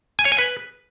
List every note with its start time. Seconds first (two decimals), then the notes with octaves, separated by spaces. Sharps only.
0.19 G#5
0.25 C#5
0.32 G#5
0.38 B4